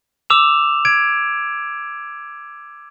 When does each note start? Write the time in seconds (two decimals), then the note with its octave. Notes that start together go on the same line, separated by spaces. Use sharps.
0.30 D6 E6 E7 F7
0.85 G#6 D7